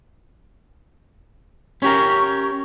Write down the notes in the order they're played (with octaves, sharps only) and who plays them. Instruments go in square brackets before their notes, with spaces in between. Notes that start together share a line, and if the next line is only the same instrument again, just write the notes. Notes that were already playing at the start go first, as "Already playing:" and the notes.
[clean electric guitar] C#4 G4 A#4 [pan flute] C#6